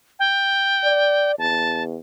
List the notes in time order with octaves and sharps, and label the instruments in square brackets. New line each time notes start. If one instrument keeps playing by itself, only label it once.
[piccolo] G5
[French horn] D5
[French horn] E2 [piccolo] A5